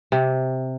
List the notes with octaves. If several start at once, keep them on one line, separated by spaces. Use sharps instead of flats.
C3